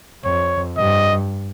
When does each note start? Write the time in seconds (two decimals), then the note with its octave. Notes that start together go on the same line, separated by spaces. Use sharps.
0.24 F2 C#5
0.77 G2 D#5